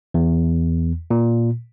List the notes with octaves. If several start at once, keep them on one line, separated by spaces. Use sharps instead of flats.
E2
A#2